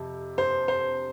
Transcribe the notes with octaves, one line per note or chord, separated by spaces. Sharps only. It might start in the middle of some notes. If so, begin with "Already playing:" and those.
Already playing: F2 C3
C5
C5